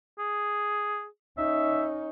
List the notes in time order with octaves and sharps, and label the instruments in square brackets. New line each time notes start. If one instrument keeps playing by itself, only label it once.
[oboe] G#4
[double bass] C#4 D#4 [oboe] E5